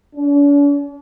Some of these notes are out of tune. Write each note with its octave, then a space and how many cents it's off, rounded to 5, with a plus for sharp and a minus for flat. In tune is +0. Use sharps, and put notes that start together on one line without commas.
D4 -45